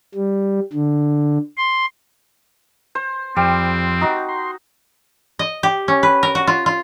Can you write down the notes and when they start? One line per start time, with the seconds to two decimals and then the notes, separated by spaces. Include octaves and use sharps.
0.15 G3
0.73 D3
1.57 C6
2.95 C5
3.36 F2 G3 C4
4.01 D#4 F#4
4.29 C6
5.39 D#5
5.63 G4
5.88 C#4
6.03 B4
6.23 A#4
6.35 F#4
6.47 F4
6.66 F4